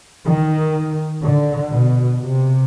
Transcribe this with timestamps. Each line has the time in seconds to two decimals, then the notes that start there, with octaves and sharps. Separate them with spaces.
0.25 D#3
1.22 D3
1.72 B2
2.21 C3